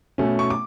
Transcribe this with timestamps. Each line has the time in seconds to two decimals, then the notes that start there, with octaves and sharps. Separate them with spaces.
0.18 B2 A3 C#4
0.39 C#6
0.50 D6